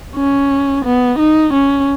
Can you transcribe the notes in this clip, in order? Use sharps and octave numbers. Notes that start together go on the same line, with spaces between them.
C#4
B3
D#4
C#4